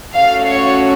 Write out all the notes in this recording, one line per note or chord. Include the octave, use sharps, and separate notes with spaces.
A3 C#4 F#4 A4 F5
C#5